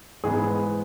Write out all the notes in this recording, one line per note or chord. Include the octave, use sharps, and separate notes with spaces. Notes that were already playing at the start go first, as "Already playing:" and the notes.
G#2 E3 G#3 B3 G#4